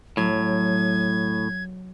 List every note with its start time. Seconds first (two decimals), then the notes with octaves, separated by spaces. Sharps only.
0.17 A2 F#3 G#6